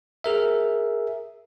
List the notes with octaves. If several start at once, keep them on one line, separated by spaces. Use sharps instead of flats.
G#4 A#4 E5